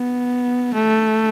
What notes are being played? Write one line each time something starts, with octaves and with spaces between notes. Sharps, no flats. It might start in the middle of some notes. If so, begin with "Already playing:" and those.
Already playing: B3
A3